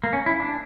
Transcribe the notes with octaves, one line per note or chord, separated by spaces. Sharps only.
A#3
C#4
E4
D4